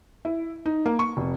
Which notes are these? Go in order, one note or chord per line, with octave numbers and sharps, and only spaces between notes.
E4
D#4
A#3
C#6
F1